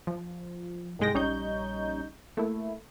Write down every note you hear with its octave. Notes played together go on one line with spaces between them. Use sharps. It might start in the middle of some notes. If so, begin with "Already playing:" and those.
F3
C2 G#2 G#3 G5 A#6
A#1 G3 C#4 D#4 C#6 G6
A3 A#3 E4